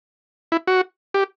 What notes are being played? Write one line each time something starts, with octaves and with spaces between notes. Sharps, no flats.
E4
F#4
G4